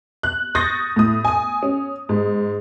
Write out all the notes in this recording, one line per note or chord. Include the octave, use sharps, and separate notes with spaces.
F#6
C#6 D#6 G6 A6 A#6
A2 D#6
G#5 D#6
C#4
G#2